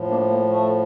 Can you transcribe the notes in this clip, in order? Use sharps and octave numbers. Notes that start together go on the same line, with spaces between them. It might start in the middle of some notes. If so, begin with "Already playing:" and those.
Already playing: A2 F3
A#3 D4
A#3
A3